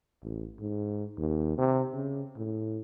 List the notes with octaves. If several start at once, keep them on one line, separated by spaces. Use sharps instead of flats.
A1
G#2
D#2
C3
C#3
A2